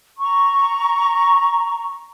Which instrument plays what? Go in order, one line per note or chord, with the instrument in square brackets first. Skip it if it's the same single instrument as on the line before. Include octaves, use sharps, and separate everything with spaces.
[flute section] A#5 C#6